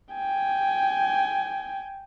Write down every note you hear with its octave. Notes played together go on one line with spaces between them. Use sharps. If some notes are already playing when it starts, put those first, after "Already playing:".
G5 G#5